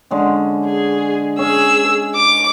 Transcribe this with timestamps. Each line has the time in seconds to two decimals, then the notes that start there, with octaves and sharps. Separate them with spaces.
0.11 D3 G#3 C#4
0.66 G#4
1.39 C#4 G#4 E6
2.15 D6